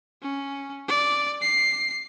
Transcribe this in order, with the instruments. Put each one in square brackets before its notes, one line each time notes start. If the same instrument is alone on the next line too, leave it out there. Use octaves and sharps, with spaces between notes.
[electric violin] C#4
D5
C7